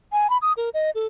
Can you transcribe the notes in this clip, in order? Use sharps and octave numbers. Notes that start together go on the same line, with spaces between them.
G#5
B5
D#6
A#4
D#5
A4